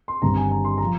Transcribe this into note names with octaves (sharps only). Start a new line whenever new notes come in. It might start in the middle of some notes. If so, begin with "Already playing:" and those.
C6
G1 G2 D#3 G3 C4 A#5
G#5
A#5
C6
F3 A#5